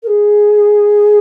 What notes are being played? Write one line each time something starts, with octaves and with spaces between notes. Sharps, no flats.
A#4
G#4